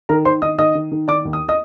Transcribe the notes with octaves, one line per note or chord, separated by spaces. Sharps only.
D#3 A#4 A#5
D#3 C5 C6
D#3 D#5 D#6
D#3 D#5 D#6
D#3
D#3
D#3 D5 D6
D#2
D#6
D#5 D#6